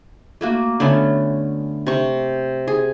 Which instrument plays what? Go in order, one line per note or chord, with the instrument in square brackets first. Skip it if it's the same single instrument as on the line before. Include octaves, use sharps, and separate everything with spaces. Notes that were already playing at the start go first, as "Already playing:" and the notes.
[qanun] A3 A#3 F#4
D3 A3 B3 C#4
C3 C#6
G#4